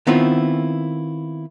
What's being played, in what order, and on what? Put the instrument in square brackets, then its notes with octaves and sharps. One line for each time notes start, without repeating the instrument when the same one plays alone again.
[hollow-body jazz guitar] D#3 B3 C4 E4 F4